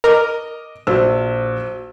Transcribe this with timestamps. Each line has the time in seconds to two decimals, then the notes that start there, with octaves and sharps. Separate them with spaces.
0.04 A#4 D#5 D6
0.87 A#1 F#4 C5 E6